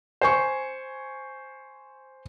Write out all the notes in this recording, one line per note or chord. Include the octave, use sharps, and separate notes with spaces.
C5 G#5 C#6